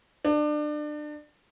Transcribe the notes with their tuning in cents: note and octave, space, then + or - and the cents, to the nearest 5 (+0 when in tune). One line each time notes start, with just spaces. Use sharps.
D4 +30